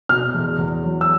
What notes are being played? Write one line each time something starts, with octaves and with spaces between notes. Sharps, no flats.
B2 F6
E2
E2
F#3
E6